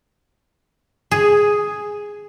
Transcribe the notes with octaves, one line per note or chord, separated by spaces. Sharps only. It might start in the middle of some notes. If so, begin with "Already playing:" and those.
G#4